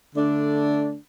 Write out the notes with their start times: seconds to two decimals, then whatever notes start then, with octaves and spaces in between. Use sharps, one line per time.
0.14 D3 A3 D4